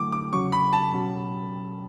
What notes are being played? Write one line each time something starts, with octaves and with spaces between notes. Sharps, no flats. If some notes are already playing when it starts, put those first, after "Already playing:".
Already playing: D3 F#3 A3 E4 D6
D6
E2 C#3 F#3 C#4 C#6
B5
A5
B2 F#3 C#4